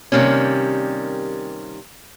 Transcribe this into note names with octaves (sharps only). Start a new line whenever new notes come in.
C3 D#3 G3 A#3 C#4